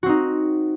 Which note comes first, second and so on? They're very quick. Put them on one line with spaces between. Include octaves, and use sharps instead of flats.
F#4 C4 D#4